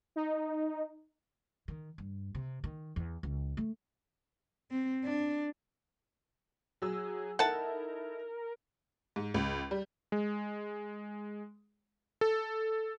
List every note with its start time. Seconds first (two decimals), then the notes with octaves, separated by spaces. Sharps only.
0.16 D#4
1.68 D#3
1.98 G2
2.35 C3
2.64 D#3
2.96 E2
3.23 C#2
3.57 A3
4.71 C4
5.05 D4
6.82 F#3 G#4 E6
7.39 D#4 E4 A4 A#4 F#5 A5
9.16 G#2
9.34 C#2
9.71 G3
10.12 G#3
12.21 A4